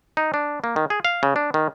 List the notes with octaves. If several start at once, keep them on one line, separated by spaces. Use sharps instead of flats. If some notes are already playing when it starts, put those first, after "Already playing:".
D#4
D4
A#3
D#3
G#4
F5
C#3
D4
D#3